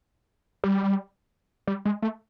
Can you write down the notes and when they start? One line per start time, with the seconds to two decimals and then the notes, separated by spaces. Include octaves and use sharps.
0.64 G3
1.67 G3
1.85 G#3
2.02 A3